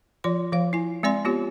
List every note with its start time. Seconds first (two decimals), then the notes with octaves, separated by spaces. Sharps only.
0.24 F3 F4 D5 C6
0.52 F3 C5 F5
0.73 E4 G#5
1.03 G#3 C4 D5 G#5 C6
1.25 B3 F4 G4 C#5